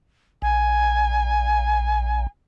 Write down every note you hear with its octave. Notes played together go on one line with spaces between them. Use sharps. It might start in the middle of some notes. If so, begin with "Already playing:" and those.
A#1 G#5